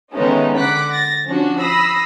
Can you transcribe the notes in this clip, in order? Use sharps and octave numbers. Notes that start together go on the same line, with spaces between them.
D#3 G#3 A3 B3 C#4 D#4
D3 F#5 D6 F#6 B6
A6 A#6
F3 C#4 D4 F#4
B5 D#6 E6 A#6 C7